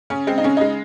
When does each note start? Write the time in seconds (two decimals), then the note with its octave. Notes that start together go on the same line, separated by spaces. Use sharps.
0.10 C#3 C#4
0.27 G#3 C4
0.38 D#4
0.44 C#3 C#4
0.57 G#3 D#4